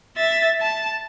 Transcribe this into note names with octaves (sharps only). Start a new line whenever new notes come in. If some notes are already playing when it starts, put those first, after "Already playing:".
E5 A6
A5